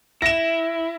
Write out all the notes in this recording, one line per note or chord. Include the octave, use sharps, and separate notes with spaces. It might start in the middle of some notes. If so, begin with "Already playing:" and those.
E4 A#6 E7